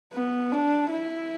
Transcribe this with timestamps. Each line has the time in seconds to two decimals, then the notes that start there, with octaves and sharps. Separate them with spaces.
0.13 B3
0.52 D4
0.91 E4